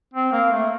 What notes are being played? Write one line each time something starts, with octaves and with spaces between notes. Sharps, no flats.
C4
A#3
A3